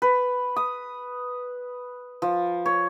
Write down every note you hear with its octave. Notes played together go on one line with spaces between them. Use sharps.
B4
D#6
F3
C#5